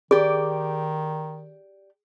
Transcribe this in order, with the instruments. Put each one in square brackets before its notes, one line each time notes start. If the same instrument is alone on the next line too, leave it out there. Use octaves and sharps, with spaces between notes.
[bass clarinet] D#3 [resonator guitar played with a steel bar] G4 D5 [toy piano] G#4